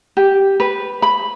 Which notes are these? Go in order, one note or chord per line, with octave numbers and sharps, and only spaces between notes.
G4
B4
B5